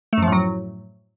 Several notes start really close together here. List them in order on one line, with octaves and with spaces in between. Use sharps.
A3 F#2 F3 A2 F#3